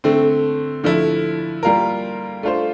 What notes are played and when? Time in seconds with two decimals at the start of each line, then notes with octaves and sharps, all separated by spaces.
0.04 D3 A3 C4
0.84 D3 F3 A3 E4
1.63 G3 A#3 F4 A#4
2.43 A3 D4 F4 C5